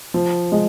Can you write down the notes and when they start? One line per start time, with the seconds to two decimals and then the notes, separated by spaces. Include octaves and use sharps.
0.14 F3
0.52 G#3